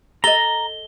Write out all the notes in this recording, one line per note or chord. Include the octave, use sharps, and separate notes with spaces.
A4 D#5 A#5 G7